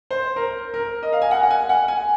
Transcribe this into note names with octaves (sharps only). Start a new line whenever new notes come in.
C5
A#4
A#4
D#5
F5
G#5
F#5
F#5
G#5
F#5
G#5